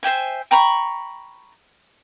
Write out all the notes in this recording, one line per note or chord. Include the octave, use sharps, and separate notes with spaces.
C5 E5 G5 G#5
G5 A#5 B5 C#6